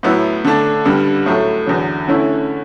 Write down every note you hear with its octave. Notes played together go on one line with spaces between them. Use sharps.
A2 F#3 B3 E4
D3 A3 D4
G2 D3 G3
A2 F#3 A3
E2 D3 F#3
D3 A3 C#4 E4